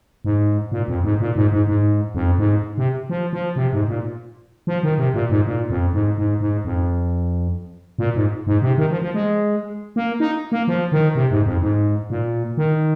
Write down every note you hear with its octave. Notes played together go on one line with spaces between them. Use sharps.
G#2
A#2
F2
G#2
A#2
G#2
G#2
G#2
F2
G#2
C3
F3
F3
C3
G#2
A#2
F3
D#3
C3
A#2
G#2
A#2
F2
G#2
G#2
G#2
F2
A#2
G#2
G#2
C3
D#3
F3
F3
G#3
A#3
D#4
A#3
F3
D#3
C3
G#2
F2
G#2
A#2
D#3